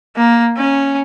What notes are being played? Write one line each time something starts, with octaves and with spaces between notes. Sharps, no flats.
A#3
C#4